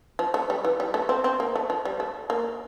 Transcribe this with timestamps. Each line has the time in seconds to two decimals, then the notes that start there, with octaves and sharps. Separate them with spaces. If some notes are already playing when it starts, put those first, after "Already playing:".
0.19 F3
0.34 A3
0.50 G3
0.65 E3
0.80 G3
0.94 A3
1.09 C4
1.24 C4
1.40 A#3
1.56 A3
1.70 F3
1.85 G3
2.00 A3
2.30 A#3